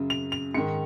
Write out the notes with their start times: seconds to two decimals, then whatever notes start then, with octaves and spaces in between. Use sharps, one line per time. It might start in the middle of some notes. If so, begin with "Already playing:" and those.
Already playing: F#2 C#3
0.10 F7
0.32 F7
0.54 G#2 D#3 C#7